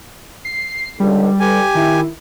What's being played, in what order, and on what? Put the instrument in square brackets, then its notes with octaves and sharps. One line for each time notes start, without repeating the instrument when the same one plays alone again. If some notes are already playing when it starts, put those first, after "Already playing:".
[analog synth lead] C7
[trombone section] C#2 D3 [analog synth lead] G3
[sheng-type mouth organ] G4 G#5 [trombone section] A4 B4
[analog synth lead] D#3 [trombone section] E4